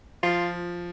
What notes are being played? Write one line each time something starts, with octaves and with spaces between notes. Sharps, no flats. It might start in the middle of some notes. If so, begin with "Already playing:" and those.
F3 F4